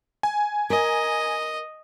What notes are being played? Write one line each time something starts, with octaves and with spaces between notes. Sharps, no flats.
G#5
A#4 D#5